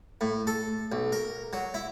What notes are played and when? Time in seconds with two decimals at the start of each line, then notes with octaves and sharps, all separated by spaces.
0.21 A2
0.47 A4
0.92 B1
1.12 A#4
1.53 F#3
1.74 E4